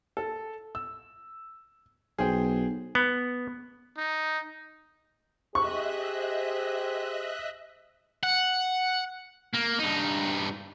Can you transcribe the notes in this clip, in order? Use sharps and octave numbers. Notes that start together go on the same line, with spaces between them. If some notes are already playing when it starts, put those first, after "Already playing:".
A4
E6
B1 G#4 C5 G5
B3
D#4
G4 G#4 C5 D#5 E5 C#6 F#6
F#5
A#3
G2 D#4